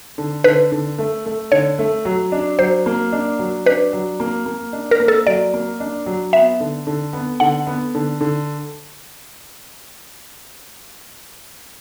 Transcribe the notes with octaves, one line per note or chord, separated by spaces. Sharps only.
D3
D3 B4
D3
A3
A3
D3 C#5
A3
F#3
D4
F#3 C5
A#3
D4
F#3
D4 B4
F#3
A#3
A#3
D4
A#4
A#3
A4
F#3 D5
A#3
D4
F#3
B3 E5
D3
D3
B3
D3 F#5
B3
D3
D3